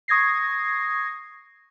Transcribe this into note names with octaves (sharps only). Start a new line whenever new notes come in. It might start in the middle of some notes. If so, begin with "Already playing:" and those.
C#6 D#6 G#6 A#6 C7